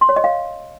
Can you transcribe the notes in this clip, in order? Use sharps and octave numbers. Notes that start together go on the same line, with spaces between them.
C6
C#5
D#5
F5